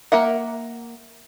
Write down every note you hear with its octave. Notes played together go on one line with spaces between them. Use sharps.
A#3 A#4 E5 F#5